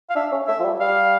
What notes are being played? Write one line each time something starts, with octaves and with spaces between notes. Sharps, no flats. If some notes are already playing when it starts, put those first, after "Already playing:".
F5
D4 E5
C#4
A3 E5
F3
G3
G3 F5